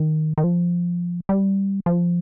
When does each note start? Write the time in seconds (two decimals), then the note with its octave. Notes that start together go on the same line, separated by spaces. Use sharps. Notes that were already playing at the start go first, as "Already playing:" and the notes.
Already playing: D#3
0.38 D#3
0.44 F3
1.29 G3
1.86 F3